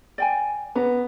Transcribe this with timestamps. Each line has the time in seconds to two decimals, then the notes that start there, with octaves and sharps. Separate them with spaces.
0.18 D5 G5 G#5
0.75 B3 A#5